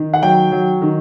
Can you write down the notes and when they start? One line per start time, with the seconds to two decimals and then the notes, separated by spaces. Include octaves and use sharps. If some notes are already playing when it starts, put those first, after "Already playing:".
Already playing: D#3
0.14 F#5
0.22 F#3 G5
0.52 F#3
0.82 D#3